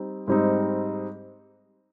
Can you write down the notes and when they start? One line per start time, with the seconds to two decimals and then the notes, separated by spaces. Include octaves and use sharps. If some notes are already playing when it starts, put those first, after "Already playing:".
Already playing: G3 C4 D#4
0.27 G#2 G3 C4 D#4